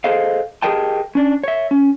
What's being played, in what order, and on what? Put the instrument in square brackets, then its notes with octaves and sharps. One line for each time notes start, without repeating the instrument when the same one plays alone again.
[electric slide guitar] G#4 A4 C5 D#5 F5
G4 G#4 A#4 D#5 G5 A5
C#4 D4
C#5 E5
C#4